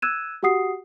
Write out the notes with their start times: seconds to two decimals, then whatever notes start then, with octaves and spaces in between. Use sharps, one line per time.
0.02 E6 F#6 G#6 D#7 E7
0.43 F#4 G4 F#5 D#6 C7